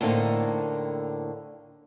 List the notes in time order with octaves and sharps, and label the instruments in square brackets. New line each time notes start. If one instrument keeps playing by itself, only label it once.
[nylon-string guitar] A2 D3 A#3 C4 D#4